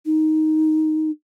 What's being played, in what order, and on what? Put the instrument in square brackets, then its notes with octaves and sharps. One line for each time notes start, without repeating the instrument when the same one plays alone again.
[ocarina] D#4